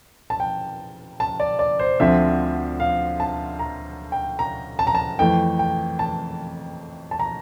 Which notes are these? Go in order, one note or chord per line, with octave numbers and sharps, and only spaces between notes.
A5
G5
A5
D5
D5
C5
D2 D3 F3 C4 E5
F5
A5
A#5
G5
A#5
A5
A#5
A5
F2 E3 A3 G5
G5
A5
A5
A#5